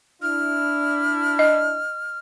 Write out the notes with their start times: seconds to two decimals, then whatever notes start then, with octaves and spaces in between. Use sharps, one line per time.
0.22 D4 E4 F6
1.39 D#5